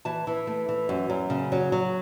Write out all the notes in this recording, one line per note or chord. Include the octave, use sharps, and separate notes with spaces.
E3 A5
E3
A3
E3
F#2
F#2
C#3
F#3
F#3